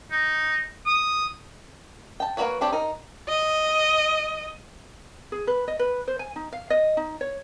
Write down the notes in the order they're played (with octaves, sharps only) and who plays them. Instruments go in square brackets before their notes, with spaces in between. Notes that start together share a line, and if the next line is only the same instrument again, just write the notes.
[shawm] D#4
D#6
[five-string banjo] G5 A5
A#3 E4 F#4 B4 C#5
C4 D4 G4 C#5
D#4 A#4
[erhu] D#5
[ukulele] G#4
B4
D#5
B4
C5
G#5
D#4
F5
D#5
D#4
C#5